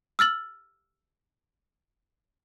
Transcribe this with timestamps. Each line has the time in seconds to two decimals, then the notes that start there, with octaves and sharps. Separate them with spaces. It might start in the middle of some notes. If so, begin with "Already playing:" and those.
0.19 E6 F6 A6 F#7